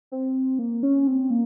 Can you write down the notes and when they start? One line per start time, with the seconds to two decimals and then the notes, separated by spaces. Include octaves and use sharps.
0.12 C4
0.59 A#3
0.83 C#4
1.07 C4
1.30 A#3